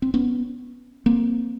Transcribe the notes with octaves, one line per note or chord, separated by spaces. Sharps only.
C4
B3 C#4
A#3 C4